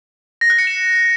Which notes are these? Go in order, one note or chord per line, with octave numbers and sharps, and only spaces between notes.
A#6
F#6
C#7
E7